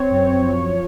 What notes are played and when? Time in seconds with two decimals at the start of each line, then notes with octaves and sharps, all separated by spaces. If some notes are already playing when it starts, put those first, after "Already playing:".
Already playing: C4 C#5
0.11 F#2
0.42 F3